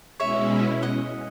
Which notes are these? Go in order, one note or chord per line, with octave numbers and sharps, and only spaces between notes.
B2 G#3 C#4 E4 C#5 E5
D#5 F#5